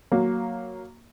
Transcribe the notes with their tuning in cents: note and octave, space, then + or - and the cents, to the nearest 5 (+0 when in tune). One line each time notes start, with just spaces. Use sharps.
F#3 +0 A#3 +0